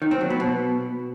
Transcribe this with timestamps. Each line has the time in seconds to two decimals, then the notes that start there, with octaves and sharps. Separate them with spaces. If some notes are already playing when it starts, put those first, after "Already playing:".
0.02 D#3
0.11 C4
0.21 F#3
0.30 B3
0.40 B2